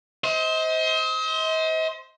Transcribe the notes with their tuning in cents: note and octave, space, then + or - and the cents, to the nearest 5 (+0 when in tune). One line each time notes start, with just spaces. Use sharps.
C5 +0 D#5 +40